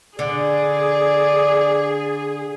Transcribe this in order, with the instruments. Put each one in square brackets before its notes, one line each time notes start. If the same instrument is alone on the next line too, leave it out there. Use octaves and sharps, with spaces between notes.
[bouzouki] D3 [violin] G#4 [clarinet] D5